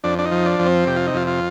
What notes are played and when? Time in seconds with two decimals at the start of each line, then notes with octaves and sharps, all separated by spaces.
0.04 F2 D4
0.19 D4
0.25 D#4
0.32 F3
0.46 D4
0.59 F2
0.66 C4
0.87 C3 G4
0.96 F4
1.07 D#4
1.14 F2 F4
1.27 F4